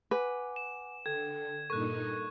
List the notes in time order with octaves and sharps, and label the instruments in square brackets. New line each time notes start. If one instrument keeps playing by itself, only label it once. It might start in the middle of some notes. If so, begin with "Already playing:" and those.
[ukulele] B4 [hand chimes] F#5 G#5 D6
[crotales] E7
[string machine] D3 [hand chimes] A4 G5 [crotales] G#6
[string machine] G2 A#2 D#4 [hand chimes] A4 A#4 G#6 [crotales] C#6 F#6